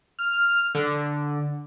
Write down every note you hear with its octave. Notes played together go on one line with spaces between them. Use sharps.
F6
D3